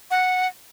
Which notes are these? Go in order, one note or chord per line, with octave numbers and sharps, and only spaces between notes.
F#5